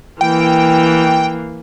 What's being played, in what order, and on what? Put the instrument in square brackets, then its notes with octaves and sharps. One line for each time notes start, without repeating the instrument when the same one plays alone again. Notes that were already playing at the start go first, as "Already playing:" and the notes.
[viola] E3 A#3 [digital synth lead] G5